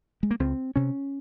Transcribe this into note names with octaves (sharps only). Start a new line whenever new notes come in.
G#3
A#3
C#2 C4
C3 C#4